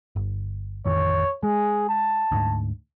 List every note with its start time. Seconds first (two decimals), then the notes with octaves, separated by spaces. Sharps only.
0.16 G1
0.85 A1 F2 D#3 C#5
1.43 G#3 G#4
1.88 A5
2.32 D2 G#2